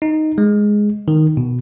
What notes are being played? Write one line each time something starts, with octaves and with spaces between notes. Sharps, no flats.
D#4
G#3
D#3
B2